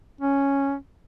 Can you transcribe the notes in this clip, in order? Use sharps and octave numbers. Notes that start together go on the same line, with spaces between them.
C#4